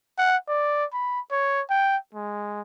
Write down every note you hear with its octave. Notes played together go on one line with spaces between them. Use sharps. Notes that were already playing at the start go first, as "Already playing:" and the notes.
F#5
D5
B5
C#5
G5
G#3